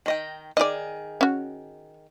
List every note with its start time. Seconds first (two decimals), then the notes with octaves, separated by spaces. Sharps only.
0.06 D#3 D#5 G5
0.57 D#3 G#4 D5 D#5
1.21 C#4 F#4